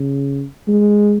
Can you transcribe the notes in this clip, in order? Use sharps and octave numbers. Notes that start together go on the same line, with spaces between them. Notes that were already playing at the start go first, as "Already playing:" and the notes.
Already playing: C#3
G#3